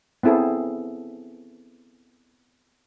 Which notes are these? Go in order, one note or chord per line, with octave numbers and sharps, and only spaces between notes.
B3 C4 E4 G#4 A4